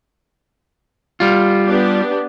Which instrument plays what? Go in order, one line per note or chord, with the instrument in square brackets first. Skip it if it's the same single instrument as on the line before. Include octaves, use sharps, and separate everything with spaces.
[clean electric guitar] G3 F4
[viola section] B3 D4 G4